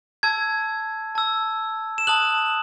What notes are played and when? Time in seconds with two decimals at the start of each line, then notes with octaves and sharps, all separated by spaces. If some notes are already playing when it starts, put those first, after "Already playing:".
0.23 A5 E6 G#6
1.15 A5 E6
1.98 E7
2.07 A5 D#6 F#6 F#7